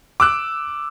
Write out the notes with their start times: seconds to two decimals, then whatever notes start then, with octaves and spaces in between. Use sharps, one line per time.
0.20 D6 E6 F#6